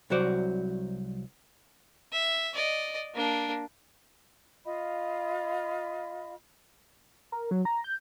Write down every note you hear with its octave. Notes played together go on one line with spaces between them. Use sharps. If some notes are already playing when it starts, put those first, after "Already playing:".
C2 C3 F#3 F#4 C5 D5
E5
D5 D#5
A#3 D4
F4 D#5 F5 B5
A#4
F#3
A#5
G6